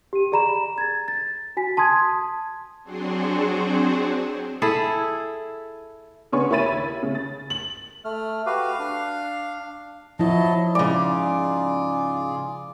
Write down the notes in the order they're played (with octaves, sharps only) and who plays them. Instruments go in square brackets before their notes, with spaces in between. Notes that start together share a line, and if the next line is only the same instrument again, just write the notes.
[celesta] G4 D#7
G#4 D5 A#5 B5 E7
G#6 A6
A6
F#4 G#5 B6
A5 C6 D#6 G#6
[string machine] F#3 C4 D4 F#4 G#4 C5
[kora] E4 G#4 A4
[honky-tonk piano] C#3 B3 C#4 D4 C#6
D#2 E4 C#5 B5 A6 D#7
C#3
A6
F#7
[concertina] A3 F6
[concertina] F#4 G4 B4 [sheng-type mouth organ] F5
[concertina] D4
[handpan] F3 E4 [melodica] F#3 D#5 A5
[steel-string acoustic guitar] G#2 C#3 [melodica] F4 G#4 [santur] D5